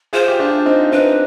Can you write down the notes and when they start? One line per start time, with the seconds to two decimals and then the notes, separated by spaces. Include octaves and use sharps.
0.13 F4 G#4 C5
0.28 G4
0.40 D4 F4
0.66 C4 D#4
0.92 C4 D#4 B4